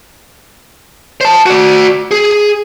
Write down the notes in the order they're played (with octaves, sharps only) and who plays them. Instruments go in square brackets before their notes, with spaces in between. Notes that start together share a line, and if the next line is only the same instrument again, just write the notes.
[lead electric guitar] C5 A5
F#4 D5
G#4